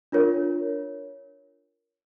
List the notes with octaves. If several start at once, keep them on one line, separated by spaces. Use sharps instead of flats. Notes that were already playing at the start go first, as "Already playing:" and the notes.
D4 F4 A#4 C#5